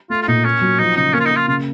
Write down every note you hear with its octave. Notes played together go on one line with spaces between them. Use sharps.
A3 F4
F4
A#2 D#4
A#3 C#4
F#3
F3 D#4
C#3 D#4
A#3 C#4
F4
A#3 D#4
F4
C#3 F4